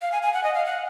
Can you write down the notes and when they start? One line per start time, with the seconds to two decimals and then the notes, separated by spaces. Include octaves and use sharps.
0.02 F5
0.12 G#5
0.23 G#5
0.34 F#5
0.44 D#5
0.54 F5
0.66 F#5